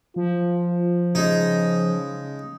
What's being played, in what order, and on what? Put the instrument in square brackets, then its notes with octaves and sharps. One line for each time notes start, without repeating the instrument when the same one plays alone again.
[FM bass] F3 [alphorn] F4
[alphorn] C#3 [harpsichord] G#3 D#4